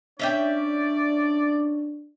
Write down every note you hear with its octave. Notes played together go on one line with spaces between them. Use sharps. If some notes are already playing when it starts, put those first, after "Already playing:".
C#4 D4 D5 E5 G5